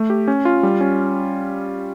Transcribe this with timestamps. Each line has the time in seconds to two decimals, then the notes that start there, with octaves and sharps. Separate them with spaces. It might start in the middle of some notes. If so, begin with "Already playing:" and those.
Already playing: A3
0.10 G4
0.28 C#4
0.45 F4
0.63 G3
0.81 C#4